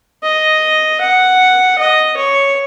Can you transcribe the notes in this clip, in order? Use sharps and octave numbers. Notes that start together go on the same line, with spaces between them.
D#5
F#5
D#5
C#5